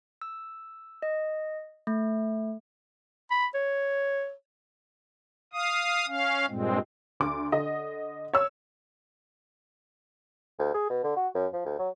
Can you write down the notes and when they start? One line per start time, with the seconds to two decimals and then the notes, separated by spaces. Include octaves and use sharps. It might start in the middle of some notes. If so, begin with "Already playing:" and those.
0.22 E6
1.02 D#5
1.87 A3
3.31 B5
3.55 C#5
5.53 F5 D#6
6.07 C#4 F5
6.48 G2 A#2 G#3 C4
7.20 D2 D6
7.52 D3 D#5
8.33 C#5 E6
10.59 D2
10.74 G#4
10.90 B2
11.04 D3
11.17 F#4
11.35 F#2
11.53 F3
11.65 D2
11.79 F#3